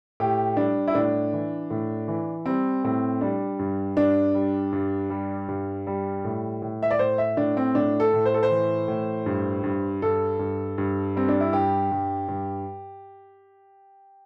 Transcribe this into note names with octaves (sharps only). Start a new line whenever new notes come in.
A2 G4
G3 D4
E4
A2 D4
E3
A2
E3
G3 C4
A2 C4
G3 D4
G2
G2 D4
G3
G2
G3
G2
G3
A2
A2
E5
D5
A2 C5
E5
A2 D4
C4
A2 D4
A4
A2
C5
A4
C5
E3
A2
G2
G2
G2 A4
G2
G2
G3 C4
D4
E4
G2 G4
G2
G2